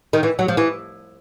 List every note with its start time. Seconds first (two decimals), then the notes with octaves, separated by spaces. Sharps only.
0.13 D#3
0.23 E3
0.39 F#3
0.48 F3
0.57 E3